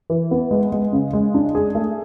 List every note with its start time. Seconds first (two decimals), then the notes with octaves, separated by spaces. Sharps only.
0.10 E3
0.31 B3
0.51 G#3
0.72 G#3
0.92 C#3
1.13 G#3
1.34 D4
1.55 G#4
1.75 A3